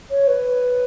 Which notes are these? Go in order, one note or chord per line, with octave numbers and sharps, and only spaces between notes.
C#5
B4